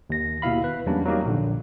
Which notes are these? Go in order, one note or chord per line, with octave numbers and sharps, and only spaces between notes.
D#2 A#6
D#2 B2 E4 F5 B5
B4
E2 F#3 G3 A#3 C#4 D4
F#3 G3 A#3 D#4 G4
A#1 D3